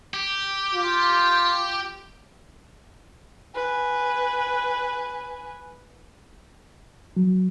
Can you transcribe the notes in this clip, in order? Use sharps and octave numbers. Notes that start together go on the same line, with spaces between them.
G4
F4
B4 G#5
F#3